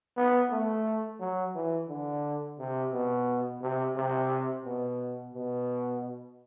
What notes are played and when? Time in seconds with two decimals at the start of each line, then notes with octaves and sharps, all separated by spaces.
0.17 B3
0.50 A3
1.20 F#3
1.55 E3
1.88 D3
2.59 C3
2.92 B2
3.61 C3
3.96 C3
4.65 B2
5.34 B2